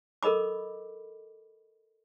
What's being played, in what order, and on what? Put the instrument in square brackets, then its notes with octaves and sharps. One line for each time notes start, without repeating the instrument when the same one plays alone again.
[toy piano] A4 A#4 D#5 B5 D6